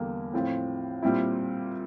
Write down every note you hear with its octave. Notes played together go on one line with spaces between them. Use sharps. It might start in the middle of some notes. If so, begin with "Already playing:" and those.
Already playing: E2 D3 G3 A#3
A2 F3 C4 F4
A#2 G3 C4 E4